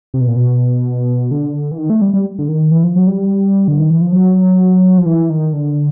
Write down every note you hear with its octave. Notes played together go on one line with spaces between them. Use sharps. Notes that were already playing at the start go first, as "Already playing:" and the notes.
C3
B2
A#2
B2
D3
E3
D#3
A3
G3
G3
D3
D#3
E3
F3
F#3
G3
D3
D#3
E3
F3
F#3
F3
E3
D#3
D3